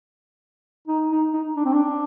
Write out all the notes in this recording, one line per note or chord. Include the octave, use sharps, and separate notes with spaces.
D#4
D#4
D#4
D4
C4
D4